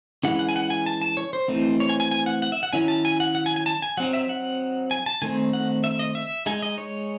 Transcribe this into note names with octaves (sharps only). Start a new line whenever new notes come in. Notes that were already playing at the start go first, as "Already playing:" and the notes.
E3 G#3 C#4 F#5
F#5
G#5
F#5
G#5
A5
A5
C#5
C5
E3 A3 C4 D#4
C#5
G#5
G#5
G#5
F#5
F#5
E5
F#5
D#3 F#3 C#4 E4 G#5
A5
G#5
F#5
F#5
G#5
G#5
A5
G#5
F#3 C4 D#4 F#5
E5
F#5
G#5
A5
D#3 A3 C4 D#4 G#5
F#5
E5
D#5
E5
G#3 D#4 G#5
D#5
C#5